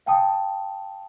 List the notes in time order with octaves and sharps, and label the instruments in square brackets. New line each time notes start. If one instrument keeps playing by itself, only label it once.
[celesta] F5 G5 A5 D#6